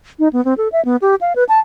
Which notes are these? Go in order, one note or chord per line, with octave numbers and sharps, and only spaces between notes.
D#4
B3
C4
A4
E5
B3
G4
F5
B4
A5